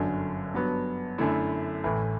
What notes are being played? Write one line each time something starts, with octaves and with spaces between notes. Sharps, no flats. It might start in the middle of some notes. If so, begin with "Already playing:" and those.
Already playing: G1 F#2 D3 F#3
G2 F#3 B3
F#2 D3 A3 E4
A1 A2 E3